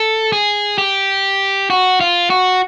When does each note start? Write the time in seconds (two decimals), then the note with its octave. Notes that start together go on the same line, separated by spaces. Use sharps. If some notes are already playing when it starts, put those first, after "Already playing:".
Already playing: A4
0.33 G#4
0.78 G4
1.70 F#4
2.01 F4
2.30 F#4